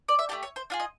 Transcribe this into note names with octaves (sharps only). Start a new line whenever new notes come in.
D5
E5
A3 D4 G4 D5
C#5
C5
D4 F4 G#4
D#5